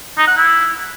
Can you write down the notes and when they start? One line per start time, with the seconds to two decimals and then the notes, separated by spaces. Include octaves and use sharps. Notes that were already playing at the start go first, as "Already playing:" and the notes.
0.18 D#4
0.27 F#5
0.37 E4